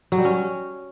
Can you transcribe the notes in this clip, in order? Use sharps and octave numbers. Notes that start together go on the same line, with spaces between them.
F#3
G3
C#4